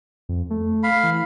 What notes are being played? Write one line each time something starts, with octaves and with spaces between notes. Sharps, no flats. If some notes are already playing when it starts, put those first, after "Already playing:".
F2
A3
F5 B5
E3